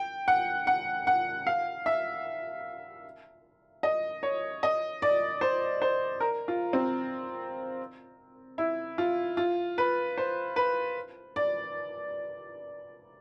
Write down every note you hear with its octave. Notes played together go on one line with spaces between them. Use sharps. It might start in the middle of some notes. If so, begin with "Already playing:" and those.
Already playing: G5
F#5
F#5
F#5
F5
E5
D#5
C#5
D#5
D5
C5
C5
A#4
F4
C4
E4
F4
F4
B4
C5
B4
D5